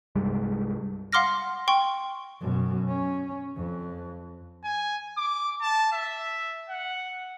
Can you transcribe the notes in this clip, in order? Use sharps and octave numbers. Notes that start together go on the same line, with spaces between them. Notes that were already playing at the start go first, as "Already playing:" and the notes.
C2 G2 G3 G#3
F5 F#5 C6 D6 F6 A#6
G5 C6 C#6
F#2 B2
C#4
F2
G#5
D6
A5
E5
F#5